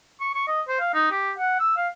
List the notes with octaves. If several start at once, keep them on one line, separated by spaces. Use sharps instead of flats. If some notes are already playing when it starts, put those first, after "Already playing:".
C#6
C#6
D#5
C5
F5
D#4
G4
F#5
E6
F5